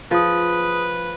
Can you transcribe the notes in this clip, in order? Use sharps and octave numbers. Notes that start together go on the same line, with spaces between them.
F3 G#4 B4 D#6